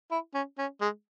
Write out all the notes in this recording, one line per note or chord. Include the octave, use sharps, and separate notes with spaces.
E4
C#4
C#4
G#3